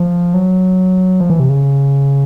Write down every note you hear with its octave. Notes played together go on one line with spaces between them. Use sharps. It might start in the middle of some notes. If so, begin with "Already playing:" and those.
Already playing: F3
F#3
F3
E3
C3
C#3